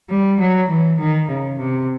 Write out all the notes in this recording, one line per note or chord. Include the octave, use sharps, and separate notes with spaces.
G3
F#3
E3
D#3
C#3
C3